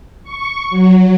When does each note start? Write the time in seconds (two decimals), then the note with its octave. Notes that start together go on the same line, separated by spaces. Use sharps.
0.23 C#6
0.70 F#3